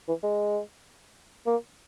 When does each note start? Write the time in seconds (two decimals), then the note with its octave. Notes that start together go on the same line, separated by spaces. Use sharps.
0.08 E3
0.23 G#3
1.47 A#3